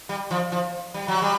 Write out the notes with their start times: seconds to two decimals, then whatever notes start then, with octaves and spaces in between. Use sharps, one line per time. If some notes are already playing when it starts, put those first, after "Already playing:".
0.09 G3
0.31 F3
0.52 F3
0.94 G3
1.08 F#3
1.22 G3